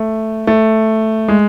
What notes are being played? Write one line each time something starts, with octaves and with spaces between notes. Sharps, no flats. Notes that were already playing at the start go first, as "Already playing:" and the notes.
Already playing: A3
A3
G#3